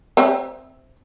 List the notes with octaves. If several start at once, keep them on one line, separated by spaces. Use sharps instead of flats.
C4 E5